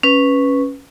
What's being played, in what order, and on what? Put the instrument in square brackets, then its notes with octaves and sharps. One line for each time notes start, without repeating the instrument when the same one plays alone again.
[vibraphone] C#4 B4